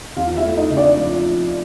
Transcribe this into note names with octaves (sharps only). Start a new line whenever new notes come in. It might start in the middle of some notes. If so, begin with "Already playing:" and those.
E2 F4 F5
E4 E5
A3
D#4 D#5
C#3
D4 D5
F3